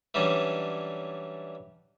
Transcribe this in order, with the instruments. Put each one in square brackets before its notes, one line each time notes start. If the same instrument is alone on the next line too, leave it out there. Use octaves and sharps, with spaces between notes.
[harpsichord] E3 F#3 G3 C#4 D4